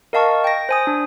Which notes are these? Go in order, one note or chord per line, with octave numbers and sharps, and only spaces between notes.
A#4 D#5 F5 A5 C#6
G5 A#6
C5 G#5 D#6
D4